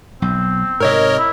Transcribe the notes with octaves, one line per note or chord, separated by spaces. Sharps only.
B1 C4
G#2 C3 A#4 C#5 D#5
E4